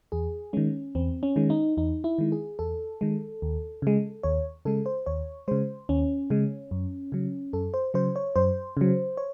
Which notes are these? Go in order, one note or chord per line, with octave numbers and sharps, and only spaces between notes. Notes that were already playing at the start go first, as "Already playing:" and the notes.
E2 G#4
D#3 G#3 C#4
E2 C4
C#4
D#3 G#3
D#4
E2 D#4
E4
D#3 G#3
G#4
E2 A4
D#3 G#3
D#2
C#3 G#3
D#2 C#5
C#3 G#3 A4
C5
D#2 C#5
C#3 G#3 C5
D#2 C#4
C#3 G#3
F#2
C#3 F#3
F#2 A4
C5
C#3 F#3 C5
C#5
F#2 C5
C#3 F#3
C#5